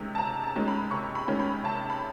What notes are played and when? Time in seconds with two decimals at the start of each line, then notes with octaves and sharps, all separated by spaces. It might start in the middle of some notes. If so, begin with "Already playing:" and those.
Already playing: C3 D#3 G#3 C#4
0.15 A5
0.18 C3 A#5
0.43 A5
0.56 D#3 G#3 C#4
0.68 B5
0.91 C3 C#6
1.15 B5
1.28 D#3 G#3 C#4
1.39 B5
1.64 C3 A5
1.90 B5